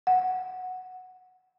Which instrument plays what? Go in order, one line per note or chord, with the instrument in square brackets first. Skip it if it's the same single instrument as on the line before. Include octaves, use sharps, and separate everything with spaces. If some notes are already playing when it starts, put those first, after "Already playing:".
[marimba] F#5